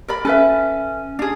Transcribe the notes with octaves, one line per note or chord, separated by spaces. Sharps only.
A#4 D5 B5
C#4 A4 B4 E5
D4 G#4